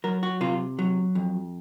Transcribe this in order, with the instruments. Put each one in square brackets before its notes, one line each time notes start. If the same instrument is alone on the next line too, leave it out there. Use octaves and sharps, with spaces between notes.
[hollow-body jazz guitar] F#3 A#4
F#4
C3 F4
F#3
F2